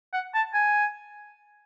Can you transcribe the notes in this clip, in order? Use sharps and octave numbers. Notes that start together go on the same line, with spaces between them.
F#5
A5
G#5